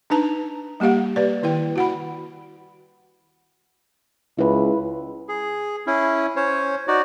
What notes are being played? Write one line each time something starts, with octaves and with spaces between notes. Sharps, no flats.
D4 D#4 B4 A5 A#5
G3 A#3 G4 F5 F#5
G4 B4 D5
D#3 E4 B4 G5
F#4 F#5 B5
C#2 E4 B4
G#4
C#4 E4
C#4 C5 C#5
D#4 F#4 D5